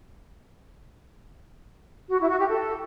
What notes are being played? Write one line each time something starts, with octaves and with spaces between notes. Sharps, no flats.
F#4
E4
F#4
G4
A4